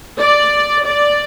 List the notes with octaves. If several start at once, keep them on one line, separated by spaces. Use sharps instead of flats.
D5
D5